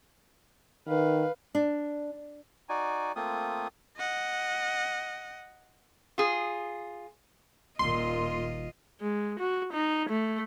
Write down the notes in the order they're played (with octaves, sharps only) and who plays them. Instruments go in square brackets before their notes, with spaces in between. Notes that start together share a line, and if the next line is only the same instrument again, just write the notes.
[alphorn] D#3 [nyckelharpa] B4 F5
[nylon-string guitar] D4
[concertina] D#4 F#4 D5 G#5
A3 A#3 C4 F4 D#6
[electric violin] D#5 F#5
[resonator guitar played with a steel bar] F4 G#4
[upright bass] D#1 D#3 [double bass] A#2 [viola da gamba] F4 D#5 [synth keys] C6
[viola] G#3
F#4
D#4
A3